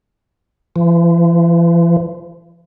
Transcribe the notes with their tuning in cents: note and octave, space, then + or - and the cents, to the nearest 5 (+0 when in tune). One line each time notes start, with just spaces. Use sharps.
E3 +45